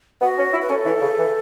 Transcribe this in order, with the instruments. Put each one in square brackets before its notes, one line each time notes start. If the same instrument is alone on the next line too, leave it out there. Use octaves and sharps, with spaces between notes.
[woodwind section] B3 [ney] F#4
[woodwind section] C#4
E4
[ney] B4
[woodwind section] C#4 [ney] A4
[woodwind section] E3
C#3
E3